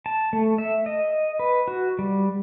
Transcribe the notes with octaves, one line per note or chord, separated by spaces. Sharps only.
A5
A3
E5
D#5
B4
F#4
G3